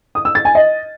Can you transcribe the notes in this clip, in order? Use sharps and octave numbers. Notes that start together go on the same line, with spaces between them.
D#6
E6
A6
G#5
D#5